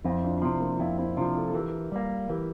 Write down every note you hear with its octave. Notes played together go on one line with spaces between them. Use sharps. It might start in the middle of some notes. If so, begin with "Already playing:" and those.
F2 C4 E4
D4 F4
D4
C3 F3 C4 E4
A#3 D4
F4
F2 C4 E4
C4 E4
C3 F3 D4 F4
F4 A4
A4
E3 G4 A#4
G3 A#3
E3 G4 A#4